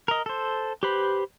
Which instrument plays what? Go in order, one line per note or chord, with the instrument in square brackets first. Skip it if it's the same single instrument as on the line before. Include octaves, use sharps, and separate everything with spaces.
[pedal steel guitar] A#4 D#5
A4 C5
G4 B4 C5 B5